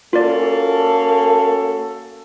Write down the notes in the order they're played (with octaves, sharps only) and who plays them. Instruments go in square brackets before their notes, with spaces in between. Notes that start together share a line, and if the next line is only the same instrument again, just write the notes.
[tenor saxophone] A#3 [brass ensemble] C#4 F#4 A4 [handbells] F4 A#4 D5